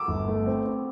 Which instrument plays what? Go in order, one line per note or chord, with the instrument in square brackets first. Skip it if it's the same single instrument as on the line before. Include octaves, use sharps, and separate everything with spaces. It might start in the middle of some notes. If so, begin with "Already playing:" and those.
Already playing: [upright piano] D6 E6
[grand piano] G1
A3
C4
C4